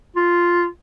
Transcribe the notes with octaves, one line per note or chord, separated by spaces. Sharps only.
F4